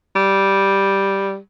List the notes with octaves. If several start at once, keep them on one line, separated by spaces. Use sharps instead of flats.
G3